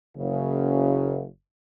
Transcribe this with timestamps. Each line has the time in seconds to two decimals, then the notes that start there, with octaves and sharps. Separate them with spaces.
0.16 F#1 F#2 C#3